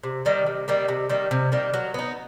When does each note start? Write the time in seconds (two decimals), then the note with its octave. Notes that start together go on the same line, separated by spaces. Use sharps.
0.03 C3
0.25 D#3 G3 A#3
0.46 C3
0.68 D#3 G3 A#3
0.88 C3
1.09 D#3 G3 A#3
1.31 C3
1.52 D#3 G3 A#3
1.74 F#3
1.94 B3 D#4